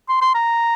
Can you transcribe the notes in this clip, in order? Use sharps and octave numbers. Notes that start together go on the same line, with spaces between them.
C6
C6
A#5